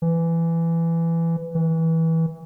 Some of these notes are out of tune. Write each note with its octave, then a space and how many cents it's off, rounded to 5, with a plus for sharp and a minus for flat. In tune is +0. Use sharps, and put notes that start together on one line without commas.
E3 +15
E3 -20